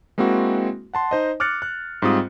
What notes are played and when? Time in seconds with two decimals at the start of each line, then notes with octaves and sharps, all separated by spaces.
0.18 G#3 A#3 C4 E4 F#4
0.94 F#5 A5 C6
1.11 D#4 C5 D#5
1.40 D6 F6 F#6 A6 C#7
1.62 F#6
2.02 G#2 G3 C4 F4 D#6